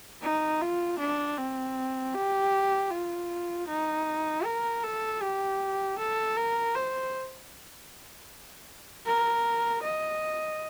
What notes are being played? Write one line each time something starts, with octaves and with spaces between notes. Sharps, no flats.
D#4
F4
D4
C4
G4
F4
D#4
A#4
A4
G4
A4
A#4
C5
A#4
D#5